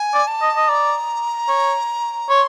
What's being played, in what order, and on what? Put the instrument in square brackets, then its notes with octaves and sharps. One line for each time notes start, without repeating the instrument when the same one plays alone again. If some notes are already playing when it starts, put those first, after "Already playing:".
Already playing: [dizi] G#5
[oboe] D5
[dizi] A5
[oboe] D#5
D#5
[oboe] D5 [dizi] A#5
[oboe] C#5
[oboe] C#5 [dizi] C6